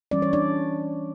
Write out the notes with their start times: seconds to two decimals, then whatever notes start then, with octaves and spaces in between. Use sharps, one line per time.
0.11 E3 G3 C#4 D5
0.22 C#5
0.33 D4 D5